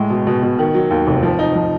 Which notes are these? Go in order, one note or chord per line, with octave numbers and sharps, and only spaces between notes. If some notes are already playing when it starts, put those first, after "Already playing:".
Already playing: A2 G#3
B2
B2
B2
D#3
F#3
D#2
F1
F3
D#4
F3